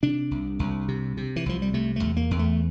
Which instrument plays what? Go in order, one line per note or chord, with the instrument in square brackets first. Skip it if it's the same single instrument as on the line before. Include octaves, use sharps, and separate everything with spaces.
[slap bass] C3 D4
C2
C2
C3
C3
E3
C2 F3
G3
C3 A3
A3
E2
A#3
E2
A3